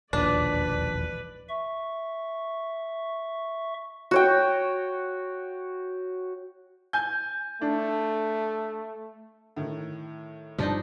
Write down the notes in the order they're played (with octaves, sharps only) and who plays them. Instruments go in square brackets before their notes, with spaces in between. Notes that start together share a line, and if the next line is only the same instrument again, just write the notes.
[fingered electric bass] E1 A#1 D#2 [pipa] D4 [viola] B4 D5
[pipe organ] E5 C#6
[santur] F#4 C#5 G5
[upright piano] G#5 G6
[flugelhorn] A3 [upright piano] D4
[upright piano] A2 D#3
[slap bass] G2 C3 G3 [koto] F3 D4 D#4